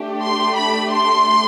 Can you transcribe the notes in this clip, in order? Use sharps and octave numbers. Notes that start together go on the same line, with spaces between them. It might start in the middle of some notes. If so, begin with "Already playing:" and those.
Already playing: A3 D4 G4
C6
B5
C6